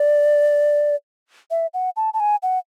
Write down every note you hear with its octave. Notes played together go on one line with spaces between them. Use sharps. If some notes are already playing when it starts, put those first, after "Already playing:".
Already playing: D5
E5
F#5
A5
A5
G#5
F#5